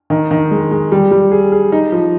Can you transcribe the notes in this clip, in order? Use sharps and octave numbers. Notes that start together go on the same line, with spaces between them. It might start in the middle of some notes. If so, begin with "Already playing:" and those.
D#3
D#3
G#3
G#3
G3
G3
G#4
G#4
D#4
F3